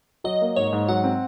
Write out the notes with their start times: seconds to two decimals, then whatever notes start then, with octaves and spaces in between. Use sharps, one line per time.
0.24 F#3 D#5
0.41 A#3
0.56 G#2 C#5
0.73 G#2
0.88 F#3 F#5
1.04 C4